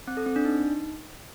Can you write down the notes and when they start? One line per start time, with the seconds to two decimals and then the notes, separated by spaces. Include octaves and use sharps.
0.07 C4
0.17 A4
0.26 C4
0.36 D4
0.45 D#4